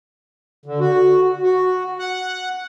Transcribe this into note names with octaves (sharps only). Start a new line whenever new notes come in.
D3
F#4
F#4
F#5